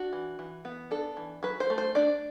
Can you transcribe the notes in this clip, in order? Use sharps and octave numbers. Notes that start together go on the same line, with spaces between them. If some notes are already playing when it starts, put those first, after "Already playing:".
Already playing: D4 F#4
E3
E3
B3
D4 A4
E3
F#3 B4
C5
A3
C5
D4 D5